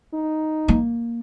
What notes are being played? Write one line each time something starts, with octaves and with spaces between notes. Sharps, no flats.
D#4
A#3